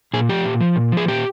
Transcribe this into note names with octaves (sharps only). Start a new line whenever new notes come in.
A#2 G#4
F3 G4
A#2
F3
A#2
F3
G#4
A#2 G4